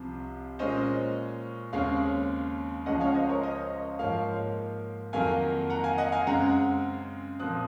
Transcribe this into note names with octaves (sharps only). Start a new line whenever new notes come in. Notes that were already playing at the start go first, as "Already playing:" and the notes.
Already playing: C2 C3 F3
A#2 G#3 C#4 C5 D#5
D#2 C#3 G#3 C4 C#5 F5
C#2 C#3 F3 G#3 C#4 D#5 F#5
C#5 F5
C5 D#5
A#4 C#5
C5 D#5
G#2 F3 A#3 C#5 F5
F2 D#3 F#3 A#3 F5 G#5
F#5 A#5
F5 G#5
D#5 F#5
F5 G#5
F#2 C#3 G#3 C4 F#5 A#5
A#2 F3 C4 D#6 F#6